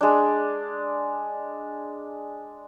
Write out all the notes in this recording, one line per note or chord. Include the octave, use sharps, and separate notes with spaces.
G#3 D4